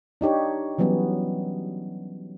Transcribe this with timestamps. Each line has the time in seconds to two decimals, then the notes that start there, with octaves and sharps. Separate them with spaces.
0.21 D4 D#4 G4 C#5
0.78 E3 F#3 G3 B3 C#4